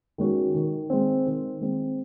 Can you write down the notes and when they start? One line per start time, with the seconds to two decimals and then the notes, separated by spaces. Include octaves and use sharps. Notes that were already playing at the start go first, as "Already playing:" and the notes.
0.18 D#3 G#3 C#4 F#4
0.55 D#3
0.90 G#3 C4
1.26 D#3
1.61 G#3 C4